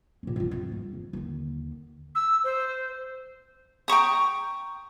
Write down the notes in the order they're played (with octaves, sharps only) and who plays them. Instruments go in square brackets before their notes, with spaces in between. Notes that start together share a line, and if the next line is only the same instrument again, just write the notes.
[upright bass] A#2 C#4
E1 F4
F2 G#2
G2
F2
D#2 D3
[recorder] E6
C5
[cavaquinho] G5 A#5 C#6 D#6